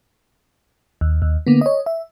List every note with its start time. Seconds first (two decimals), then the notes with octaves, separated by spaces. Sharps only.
1.01 D#2
1.22 D#2
1.47 D3 A#3 B3
1.61 C#5 D#5
1.86 E5